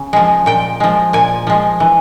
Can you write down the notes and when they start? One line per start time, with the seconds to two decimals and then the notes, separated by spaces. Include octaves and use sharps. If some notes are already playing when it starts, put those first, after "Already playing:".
Already playing: C#3
0.13 F3 G#3
0.46 A#2 G5
0.80 F3 G#3
1.13 A#2 G#5
1.47 F3 G#3
1.80 E3